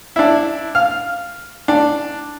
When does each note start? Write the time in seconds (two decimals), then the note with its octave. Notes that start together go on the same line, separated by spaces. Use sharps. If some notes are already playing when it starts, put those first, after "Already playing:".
0.16 D4 E4
0.75 F5
1.68 D4